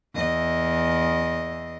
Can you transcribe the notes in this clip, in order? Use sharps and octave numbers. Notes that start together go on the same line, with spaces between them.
E2 D#5